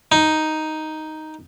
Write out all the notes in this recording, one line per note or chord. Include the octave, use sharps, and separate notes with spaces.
D#4